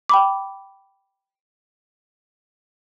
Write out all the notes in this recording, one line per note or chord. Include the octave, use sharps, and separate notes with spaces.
G5 B5 D6